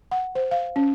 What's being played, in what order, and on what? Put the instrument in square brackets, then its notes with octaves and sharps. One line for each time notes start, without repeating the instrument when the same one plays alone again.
[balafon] F#5
C5
F5
C#4